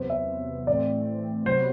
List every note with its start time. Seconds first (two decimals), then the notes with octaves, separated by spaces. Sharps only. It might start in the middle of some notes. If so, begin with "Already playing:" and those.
Already playing: E2 C3 F#3 B3 C5
0.10 E5
0.67 A2 E3 A3 C4 D5
1.46 C3 F#3 B3 F#4 B4 C5